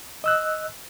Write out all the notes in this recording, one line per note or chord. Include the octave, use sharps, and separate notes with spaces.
D#5 E6 F#6